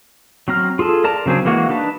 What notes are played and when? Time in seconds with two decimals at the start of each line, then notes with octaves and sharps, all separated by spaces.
0.48 F#3 C4 A#5 F6
0.79 F4 G#4 A4 A5
1.04 A#4 D5 A5 A#5
1.26 C#3 F#3 C4 D4 G#4
1.45 E3 G#3 A#3 F#4
1.69 D4 D#4 B4 A5